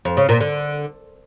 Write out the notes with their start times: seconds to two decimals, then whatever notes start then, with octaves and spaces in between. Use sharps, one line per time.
0.05 F2
0.17 C#3
0.29 A#2
0.40 D3